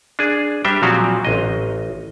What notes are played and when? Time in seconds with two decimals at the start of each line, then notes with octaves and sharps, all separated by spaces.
0.19 D4 G#4
0.65 G3 D4 G4 C5 E5 G5
0.83 A#2 F3 F#3 C4 F#4 F5
1.25 A1 D#5